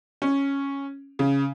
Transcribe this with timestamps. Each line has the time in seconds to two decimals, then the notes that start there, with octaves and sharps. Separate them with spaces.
0.22 C#4
1.19 C#3